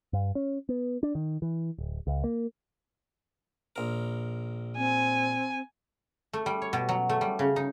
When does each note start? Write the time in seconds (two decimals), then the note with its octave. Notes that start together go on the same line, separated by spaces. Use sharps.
0.13 G2
0.35 C#4
0.69 B3
1.03 D4
1.15 D#3
1.42 E3
1.78 D1
2.07 C#2
2.24 A#3
3.76 A#1 A#4
4.77 C4 G#5
6.33 A3
6.46 G3
6.62 C#5
6.73 B2
6.89 F#3
7.09 A3
7.21 G3
7.39 C#3
7.56 D#4